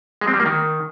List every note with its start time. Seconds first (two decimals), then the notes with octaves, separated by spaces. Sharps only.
0.21 G#3
0.28 C4
0.34 G3
0.40 A#3
0.46 D#3